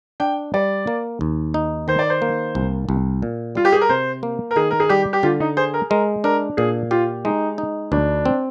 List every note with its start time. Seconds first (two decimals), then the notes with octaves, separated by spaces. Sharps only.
0.20 D4 G5
0.54 G3 D5
0.87 A#3
1.21 D#2
1.54 D#4
1.88 D#3 C5
1.99 D5
2.10 C5
2.22 A#3
2.55 C2
2.89 C2
3.22 A#2
3.55 G3 F4
3.65 G4
3.72 G#4
3.81 A#4
3.89 C3 C5
4.23 A#3
4.51 A#4
4.56 D#3 G#4
4.71 A#4
4.80 G#4
4.89 G3 G4
5.13 G4
5.23 D3 F4
5.40 D#4
5.57 G#4 C5
5.74 A#4
5.90 G#3 A#4
6.24 D4 A#4
6.57 A#2 G#4
6.91 F4 G4
7.25 G#3 D#4
7.58 D#4
7.92 D2 D4
8.25 C4